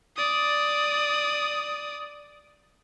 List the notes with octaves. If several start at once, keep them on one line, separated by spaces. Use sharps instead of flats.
D5 D#6